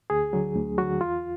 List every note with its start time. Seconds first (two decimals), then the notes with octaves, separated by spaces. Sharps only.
0.10 D2 G#4
0.33 D3 F#3
0.56 D2
0.78 D3 F#3 F#4
1.01 E2 F4